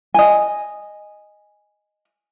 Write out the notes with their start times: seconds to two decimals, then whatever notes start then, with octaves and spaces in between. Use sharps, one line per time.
0.14 D#5 G#5